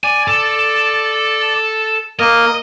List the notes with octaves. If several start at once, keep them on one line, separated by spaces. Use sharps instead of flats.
D5 G#5
A4
A#3 A#4 D#5